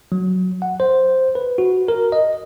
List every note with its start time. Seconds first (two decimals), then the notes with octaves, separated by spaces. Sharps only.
0.12 F#3
0.62 F#5
0.80 C5
1.35 B4
1.58 F#4
1.88 A#4
2.12 D#5